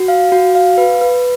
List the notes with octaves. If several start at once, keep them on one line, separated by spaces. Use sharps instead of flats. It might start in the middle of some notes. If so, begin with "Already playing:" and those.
Already playing: F#4
F5
F#4
F5
B4
B4